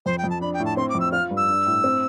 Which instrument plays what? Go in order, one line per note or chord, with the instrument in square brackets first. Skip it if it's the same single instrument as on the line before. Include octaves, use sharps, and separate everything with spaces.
[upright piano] F2 [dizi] C5
[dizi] G5
[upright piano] F2
[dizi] A5
[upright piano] D4 [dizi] B5
[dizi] G5
[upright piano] A2
[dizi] A5
[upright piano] C4 [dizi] C6
[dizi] D6
[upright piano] F2
[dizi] E6
[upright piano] F4 [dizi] F6
[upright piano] G2
[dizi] E6
[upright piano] D4
A2
C4